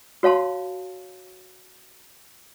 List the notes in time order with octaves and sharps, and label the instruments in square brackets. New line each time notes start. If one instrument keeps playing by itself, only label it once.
[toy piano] F#4 C#5 F5 A5 C6